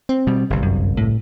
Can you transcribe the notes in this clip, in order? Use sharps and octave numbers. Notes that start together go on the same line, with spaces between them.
C4
B2 G3
G1 C2
F#2
A2